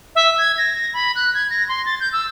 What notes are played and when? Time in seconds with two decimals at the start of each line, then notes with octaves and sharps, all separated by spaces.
0.15 E5
0.38 G#6
0.58 A#6
0.94 B5
1.15 F#6
1.34 G#6
1.50 A#6
1.69 C6
1.85 A6
2.00 G6
2.13 E6